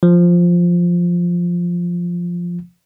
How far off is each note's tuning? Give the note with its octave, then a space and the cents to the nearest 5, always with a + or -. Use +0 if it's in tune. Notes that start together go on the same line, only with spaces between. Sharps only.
F3 +0